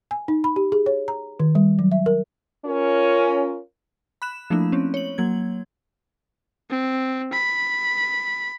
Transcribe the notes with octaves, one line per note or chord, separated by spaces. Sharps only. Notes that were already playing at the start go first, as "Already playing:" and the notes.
G#5
D#4
B5
G4
G#4
C#5
A#5
D#3
G3
F#3
E5
A#4
C#4 F4 A#4
B5 F#6 E7
F3 A3 A#3 D4 E4
C4 C#4
C#5 F#7
F#3 A#3 G#6
C4
B5